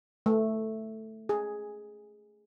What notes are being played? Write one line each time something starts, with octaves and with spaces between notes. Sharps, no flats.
A3
G#4